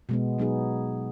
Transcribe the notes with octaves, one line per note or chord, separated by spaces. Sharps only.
B2 G#3 B3
F#3 B3 D#4 G#4